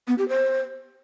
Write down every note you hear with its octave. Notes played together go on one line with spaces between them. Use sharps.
B3
G4
C5